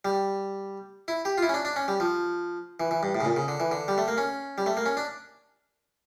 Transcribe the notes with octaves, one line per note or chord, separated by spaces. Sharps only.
G3
E4
G4
F4
E4
C#4
D4
D4
C#4
G3
F3
E3
E3
G2
A2
C#3
A#2
C#3
D3
E3
D3
G3
A3
A#3
C#4
G3
A3
A#3
C#4
D4